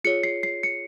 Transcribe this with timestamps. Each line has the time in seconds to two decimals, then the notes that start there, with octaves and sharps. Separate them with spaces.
0.04 F4 G#4 C#5 C#7
0.23 C7
0.43 C7
0.63 C#7